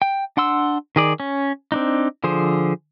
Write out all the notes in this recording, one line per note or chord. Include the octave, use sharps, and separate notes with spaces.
G5
D4 F#5 C6 E6
D#3 G#4 D5
C#4
C4 D4 D#4
D3 F3 G#4 C5